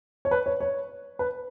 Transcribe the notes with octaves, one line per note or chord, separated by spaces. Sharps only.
C#5
B4
C#5
C#5
B4